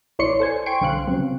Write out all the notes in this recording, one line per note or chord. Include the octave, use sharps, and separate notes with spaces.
B1 E4 C#5 D5 C6 C#7
A4 C5 G#5
G5 C6 C#6 D7
C2 D3 C5 F5 F#6
C#3 F#3 C4